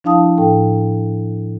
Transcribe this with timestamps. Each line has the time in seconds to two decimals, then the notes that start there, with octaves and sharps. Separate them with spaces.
0.04 F3 D4 E4 F5 A5 D#6
0.38 A2 A4 G5